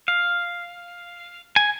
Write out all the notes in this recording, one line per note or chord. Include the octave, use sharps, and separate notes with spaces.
F5
G#5